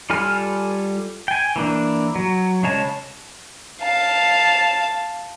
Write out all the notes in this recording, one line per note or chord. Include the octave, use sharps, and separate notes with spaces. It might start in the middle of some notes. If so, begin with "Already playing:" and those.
G3 F4 A4 G#5 F6
G5 G#5
E3 A#3 D4
F#3
C#3 G#3 C#5 A5
F5 A5